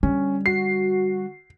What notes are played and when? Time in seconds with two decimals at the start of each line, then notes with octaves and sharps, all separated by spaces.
0.03 D3 G3 C#4
0.46 F#4 C7